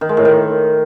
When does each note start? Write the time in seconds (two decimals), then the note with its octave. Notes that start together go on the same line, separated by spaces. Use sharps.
0.01 D#3
0.09 G#3
0.17 A2
0.25 D#3